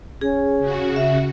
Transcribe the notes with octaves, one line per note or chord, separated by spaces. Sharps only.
C#4 G#4
C#3 F#4
E5